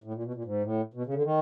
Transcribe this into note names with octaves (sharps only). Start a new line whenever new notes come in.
A2
A#2
B2
A#2
G#2
A2
B2
C#3
D3
D#3